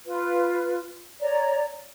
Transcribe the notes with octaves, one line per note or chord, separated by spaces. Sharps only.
F4 B4
C#5 D5 A#5